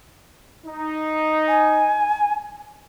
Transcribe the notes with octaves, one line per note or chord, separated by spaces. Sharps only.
D#4
G#5